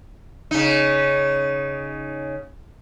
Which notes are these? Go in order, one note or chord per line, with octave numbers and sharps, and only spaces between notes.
C#3 D#4